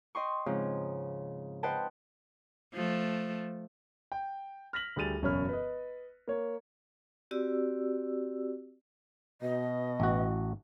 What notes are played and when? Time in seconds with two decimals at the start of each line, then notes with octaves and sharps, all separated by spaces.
0.15 D#5 G5 C6 C#6
0.46 G#2 C#3 F3 C4
1.63 B4 C5 D#5 F#5 G5 A5
2.73 F3 A3
4.12 G5
4.73 F6 A#6 B6 F#7
4.96 D2 G3 G#4 A6 D#7 F7
5.22 E1 F#2 C#3 C#5 B5 F6
5.49 B4 D#5
6.28 A#3 C#5
7.31 C4 F#4 G4 D5 E6
9.41 B2 D#5
10.00 A1 F#4